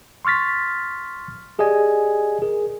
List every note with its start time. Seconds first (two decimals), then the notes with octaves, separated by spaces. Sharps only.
0.25 C6 C#6 F6 A6 B6
1.59 G4 G#4 D5 D#5 G#5
2.42 G#4 A#4